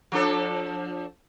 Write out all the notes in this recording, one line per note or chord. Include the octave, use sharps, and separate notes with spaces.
F3 D4 A4